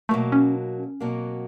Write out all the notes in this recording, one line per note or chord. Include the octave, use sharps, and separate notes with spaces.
B2 F#3 A3 A#3
C#4
D4
C#4
B2 F#3 A#3 C4